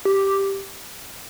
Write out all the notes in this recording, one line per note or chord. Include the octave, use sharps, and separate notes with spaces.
G4